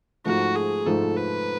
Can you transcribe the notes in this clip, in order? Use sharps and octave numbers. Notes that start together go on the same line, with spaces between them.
G#2 F3 A3 F#4
G#4
G#2 F3 A3 A4
B4